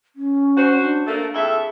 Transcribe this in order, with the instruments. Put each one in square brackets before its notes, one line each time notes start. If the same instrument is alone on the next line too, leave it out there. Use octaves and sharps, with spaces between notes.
[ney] C#4
[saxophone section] F#4 C5
[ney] D4
[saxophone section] A3 A#3
[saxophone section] F2 A4 E5 [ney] G#4